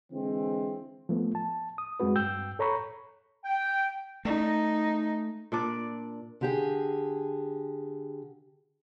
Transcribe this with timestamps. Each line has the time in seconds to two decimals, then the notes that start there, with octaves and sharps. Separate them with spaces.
0.12 D3 E3 G#3 C4
1.09 F3 A3 B3
1.35 A5
1.78 D#6
2.00 F#2 G#3 C4 F#4 B4
2.16 G2 G5 E6 G6
2.59 A4 C#5 A#5 B5 C#6
3.45 G5
4.25 A3 D#4
5.52 A#2 D4 D5
6.41 D3 G4 G#4